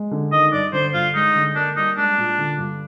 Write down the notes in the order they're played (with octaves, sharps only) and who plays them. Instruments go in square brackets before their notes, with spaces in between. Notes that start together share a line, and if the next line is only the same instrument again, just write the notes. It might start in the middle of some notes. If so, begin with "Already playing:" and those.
Already playing: [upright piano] G#3
D3
[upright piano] D#3 [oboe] D#5
[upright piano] G2 [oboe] D5
[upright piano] D3 [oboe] C5
[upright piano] G2 [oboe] F4
[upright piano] G#3 [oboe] D#4
[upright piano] D3
[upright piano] A#3 [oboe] D4
[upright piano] G3 [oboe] D#4
[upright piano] G#3 [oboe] D4
[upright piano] A#2
D3
G2